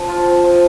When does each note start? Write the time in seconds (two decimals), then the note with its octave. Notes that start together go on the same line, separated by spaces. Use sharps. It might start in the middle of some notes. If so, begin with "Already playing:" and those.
Already playing: F3 C4 D4
0.09 F4
0.26 C4
0.44 F3